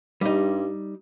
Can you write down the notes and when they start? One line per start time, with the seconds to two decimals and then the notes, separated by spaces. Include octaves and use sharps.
0.21 G2 G3 D#4